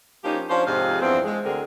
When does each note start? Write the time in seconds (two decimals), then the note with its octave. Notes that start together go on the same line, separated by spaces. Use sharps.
0.23 F3 A#3 C#4 D#4 G4
0.48 F3 C#4 D4 C5
0.65 F2 G#2 C3 G#4 F5
1.00 E2 G2 F3 C4
1.24 G#3
1.43 D2 D3 C4 G#4 A#4